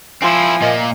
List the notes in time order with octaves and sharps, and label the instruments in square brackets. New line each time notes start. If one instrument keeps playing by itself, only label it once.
[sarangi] F3 [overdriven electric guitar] C4 E4 [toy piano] F5 C6 E6 [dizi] G#5
[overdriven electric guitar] A#2 A#3 [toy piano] D#5 E5